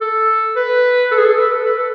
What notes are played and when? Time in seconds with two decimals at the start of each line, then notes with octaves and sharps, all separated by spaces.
0.01 A4
0.56 B4
1.11 A4
1.18 G#4
1.25 A4
1.39 B4
1.52 A4
1.66 B4
1.77 A4